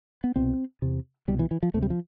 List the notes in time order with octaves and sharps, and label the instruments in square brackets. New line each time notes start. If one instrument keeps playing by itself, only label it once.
[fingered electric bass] B3
C2 B2 C4
E2 C3
C2 B2 G3
E3
E3
F3
D2 C3 A3
G3
F3